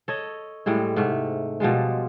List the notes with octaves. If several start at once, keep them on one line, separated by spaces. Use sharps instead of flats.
A4 C#5 D#5
A2 G3 G#3 E4
G#2 C3 A3
B2 F3 G3 G#3